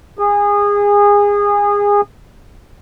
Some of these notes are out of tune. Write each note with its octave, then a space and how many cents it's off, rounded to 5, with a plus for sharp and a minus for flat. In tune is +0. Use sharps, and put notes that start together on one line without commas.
G#4 -25